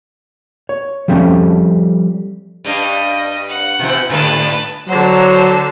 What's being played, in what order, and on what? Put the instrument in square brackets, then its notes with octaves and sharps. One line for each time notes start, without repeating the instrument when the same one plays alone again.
[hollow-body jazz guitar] C#5
F3 G3 A3 C4 C#4
[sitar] G2 G3 D4 [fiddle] D#5
[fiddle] F#5
[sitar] B2 E3 C4
[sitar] G#2 D3 G3 [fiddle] B4 A5
[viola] D3 C5 [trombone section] F#3